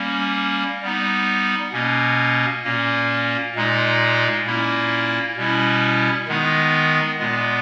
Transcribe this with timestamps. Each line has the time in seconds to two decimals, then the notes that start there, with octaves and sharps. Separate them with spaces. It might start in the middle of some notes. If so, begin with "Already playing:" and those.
Already playing: G3 A#3 C#4
0.82 G3 B3 D#4
1.72 B2 A#3 C#4
2.64 A#2 A#3 C#4
3.55 A#2 G#3 D#4
4.46 A#2 A#3 C#4 E4
5.37 B2 G3 C#4 E4
6.27 D#3 G#3 B3 D#4
7.19 A#2 G#3 B3